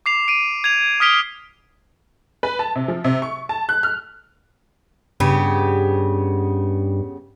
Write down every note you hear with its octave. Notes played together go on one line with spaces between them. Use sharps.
D6 C7 F7
D7 D#7
G#6 F7
D#6 F6 B6 D7 G7
B4
A5
C3
F3
C3
C#6
A5
F#6
F6
G2 C#3 B3 G4